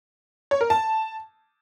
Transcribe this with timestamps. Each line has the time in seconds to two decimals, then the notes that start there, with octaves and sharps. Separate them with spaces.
0.51 C#5
0.61 A#4
0.70 A5